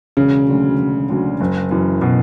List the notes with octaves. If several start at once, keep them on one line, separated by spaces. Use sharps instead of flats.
E1 C#3
D2 D3 F#3
E1
D2 D3 F#3
F#1
F#2 E3
B2